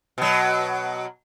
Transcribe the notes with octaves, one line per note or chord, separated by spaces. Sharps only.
B2 F#3